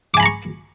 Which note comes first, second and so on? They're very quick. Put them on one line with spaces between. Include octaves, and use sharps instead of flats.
D6 G#5 B5 A#5 C#6